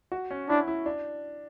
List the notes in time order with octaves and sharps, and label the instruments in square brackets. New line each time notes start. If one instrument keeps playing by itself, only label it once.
[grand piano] F#4
C#4
[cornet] D4 [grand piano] E4
[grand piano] E4
D4